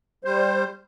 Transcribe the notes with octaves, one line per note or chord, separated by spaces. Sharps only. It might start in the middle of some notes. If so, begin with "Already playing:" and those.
G3 C5